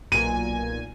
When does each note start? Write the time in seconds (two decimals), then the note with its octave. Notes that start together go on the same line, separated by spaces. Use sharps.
0.12 B1 A#2 G#5 D#7